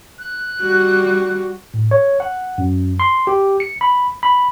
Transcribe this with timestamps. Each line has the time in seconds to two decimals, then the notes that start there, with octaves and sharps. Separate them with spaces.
0.18 F#6
0.61 G3 F#4
1.74 A2
1.91 C#5
2.20 F#5
2.58 F#2
3.00 C6
3.27 G4
3.60 C#7
3.81 B5
4.23 B5